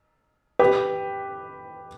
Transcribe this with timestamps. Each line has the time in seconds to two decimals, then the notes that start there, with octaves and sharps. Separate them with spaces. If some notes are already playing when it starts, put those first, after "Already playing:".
0.59 G4 B4